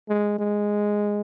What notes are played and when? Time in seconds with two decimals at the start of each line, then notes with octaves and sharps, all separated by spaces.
0.09 G#3
0.38 G#3